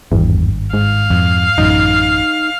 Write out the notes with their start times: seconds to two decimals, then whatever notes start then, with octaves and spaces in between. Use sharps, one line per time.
0.12 G#1 E2 G2
0.73 G#2 F5
1.10 F2
1.58 A1 F#2 D#4